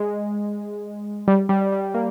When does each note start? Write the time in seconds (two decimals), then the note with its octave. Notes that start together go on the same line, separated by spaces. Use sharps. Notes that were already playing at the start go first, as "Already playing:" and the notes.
Already playing: G#3
1.28 G3
1.49 G3
1.72 G3
1.94 A#3